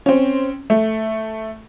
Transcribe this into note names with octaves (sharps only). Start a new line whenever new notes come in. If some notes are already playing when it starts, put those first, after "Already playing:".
C4 C#4
A3